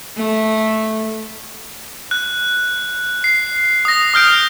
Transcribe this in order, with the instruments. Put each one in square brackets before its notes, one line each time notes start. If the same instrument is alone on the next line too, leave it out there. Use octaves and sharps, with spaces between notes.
[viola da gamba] A3
[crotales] F#6
C7
D#6 A#6
D#6 F6 G6 D7